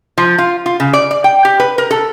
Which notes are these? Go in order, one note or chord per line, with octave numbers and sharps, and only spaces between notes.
F3
F4
F4
C#3
D5
D5
G5
G4
B4
A#4
A4